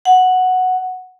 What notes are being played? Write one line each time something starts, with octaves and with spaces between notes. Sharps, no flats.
F#5